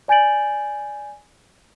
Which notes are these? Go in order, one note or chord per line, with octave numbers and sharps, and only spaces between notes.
D5 G#5 G6 A6 D7 F#7